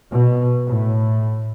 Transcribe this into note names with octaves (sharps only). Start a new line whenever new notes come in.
B2
A2